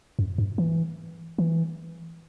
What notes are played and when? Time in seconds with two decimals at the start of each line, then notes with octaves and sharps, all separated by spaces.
0.19 F#2
0.38 G2
0.58 E3
1.38 E3